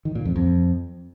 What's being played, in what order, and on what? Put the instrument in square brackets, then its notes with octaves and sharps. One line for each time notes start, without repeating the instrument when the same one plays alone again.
[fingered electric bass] D#3
A#2
F2
F2